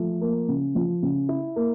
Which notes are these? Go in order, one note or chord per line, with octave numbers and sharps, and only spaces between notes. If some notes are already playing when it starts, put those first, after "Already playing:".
Already playing: F3 A3
A#3
C#3
F3
C#3
E4
A#3